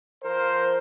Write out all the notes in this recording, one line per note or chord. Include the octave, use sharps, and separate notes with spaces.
F3 A#4 C5